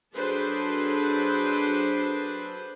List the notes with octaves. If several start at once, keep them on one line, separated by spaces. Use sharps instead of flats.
F#3 D4 G#4 A4 B4 C5